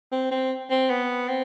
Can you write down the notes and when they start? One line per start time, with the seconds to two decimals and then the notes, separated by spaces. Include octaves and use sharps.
0.12 C4
0.31 C4
0.70 C4
0.90 B3
1.29 C4